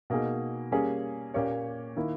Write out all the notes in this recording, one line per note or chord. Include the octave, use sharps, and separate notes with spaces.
B2 A#3 D#4 G#4
G3 A#3 C#4 G#4
A#2 A#3 C#4 G4 C#5
D#3 A#3 E4